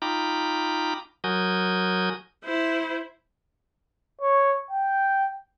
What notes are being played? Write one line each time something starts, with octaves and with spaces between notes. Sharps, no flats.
D#4 F4 G5 A#5 B5 D6
F#3 F#4 A#4 G#5 D#6 G6
E4 C5
C#5
G5